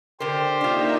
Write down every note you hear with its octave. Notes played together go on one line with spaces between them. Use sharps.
D3 G4 A#4 C5
A#3 D4 D#4 F4 E5